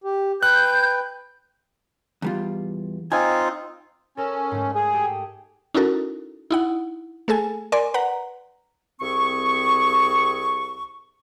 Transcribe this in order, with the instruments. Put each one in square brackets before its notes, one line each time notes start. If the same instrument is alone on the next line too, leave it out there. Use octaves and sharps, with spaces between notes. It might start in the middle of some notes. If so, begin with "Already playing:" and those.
[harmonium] G4
[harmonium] B4 G5 [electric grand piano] F#6 [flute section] G6
[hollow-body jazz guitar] E2 G3 F4
[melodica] C4 D#4 F4 [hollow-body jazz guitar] G#5
[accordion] C#4 [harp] A4 A#4 E6
[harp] G#2 A3
[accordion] G#4 [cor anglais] G#5
[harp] G4 A4
[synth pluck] C#4 D#4 E4 F#4 A4 A#4
D#4 E4 F#5
A3 G#4 A4 G#5
A#4 D5 G#5 C6
B4 F#5 A#5
[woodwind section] C2 C4 G#4 C#6